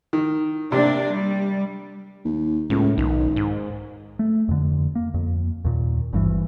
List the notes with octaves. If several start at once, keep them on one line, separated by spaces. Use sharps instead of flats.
D#3
C3 A#3 D4
G3
D#2
C#2 A2
B1 D#3
G#2
A3
F2 D3
A#3
F2
D#2 A#2
G#1 G2 E3